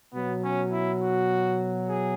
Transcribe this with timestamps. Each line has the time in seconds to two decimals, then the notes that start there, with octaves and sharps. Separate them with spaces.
0.13 B2 F#3 B3
0.42 C#4
0.71 E4
1.00 F#4
1.86 G#4